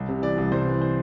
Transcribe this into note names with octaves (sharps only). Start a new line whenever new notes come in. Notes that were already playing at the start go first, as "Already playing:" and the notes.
Already playing: C2
C3
E3 D5
C2
C2 C5
E3
C5